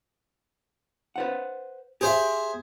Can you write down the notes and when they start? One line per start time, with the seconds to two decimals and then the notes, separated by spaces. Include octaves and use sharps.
1.16 B4 C5 F#5
2.01 G4 G#4 C5 E5